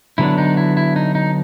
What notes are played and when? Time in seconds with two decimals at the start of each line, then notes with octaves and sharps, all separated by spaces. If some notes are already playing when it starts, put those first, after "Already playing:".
0.18 D3 F#3 B3 D4 E4
0.38 D#4
0.57 E4
0.77 E4
0.96 D#4
1.15 D#4